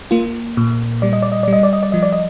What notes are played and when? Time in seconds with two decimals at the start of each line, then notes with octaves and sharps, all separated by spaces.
0.11 A#3 F4
0.57 A#2
1.02 G3 D5
1.13 D#5
1.22 D5
1.32 D#5
1.43 G3 D5
1.53 D#5
1.63 D5
1.73 D#5
1.83 D5
1.92 F3 D#5
2.03 D5
2.13 D#5